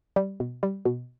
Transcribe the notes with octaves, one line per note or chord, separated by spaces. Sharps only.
G3
B2
G3
B2